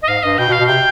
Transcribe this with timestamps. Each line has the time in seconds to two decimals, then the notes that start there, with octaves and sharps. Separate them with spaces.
0.02 D#5
0.08 G#2 F5
0.23 G2 D#5
0.38 B2 G5
0.48 B2
0.52 F5
0.59 B2
0.67 C3 G5